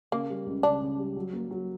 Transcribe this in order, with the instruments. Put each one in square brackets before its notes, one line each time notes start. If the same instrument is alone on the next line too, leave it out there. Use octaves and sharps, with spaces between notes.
[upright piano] C#3 [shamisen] A#3
[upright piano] G3
C#2
[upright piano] C#3 [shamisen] D4
[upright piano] C#3
G3
F#3
A#3
F#3